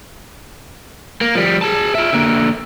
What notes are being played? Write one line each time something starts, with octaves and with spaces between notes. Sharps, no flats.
A#3
F3 G3
G#4 A5
F4 E5
D3 A#3